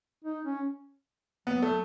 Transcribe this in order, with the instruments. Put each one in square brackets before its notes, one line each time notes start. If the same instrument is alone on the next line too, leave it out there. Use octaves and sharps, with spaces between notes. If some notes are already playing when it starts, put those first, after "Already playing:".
[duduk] D#4
C#4
[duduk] F#3 [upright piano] B3
[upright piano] A3